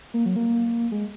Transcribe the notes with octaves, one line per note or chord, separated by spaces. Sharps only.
A#3
F#3
A#3
G#3